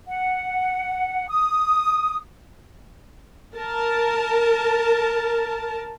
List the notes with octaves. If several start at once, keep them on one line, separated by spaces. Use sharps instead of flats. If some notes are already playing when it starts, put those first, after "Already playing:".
F#5
D#6
A#4 A5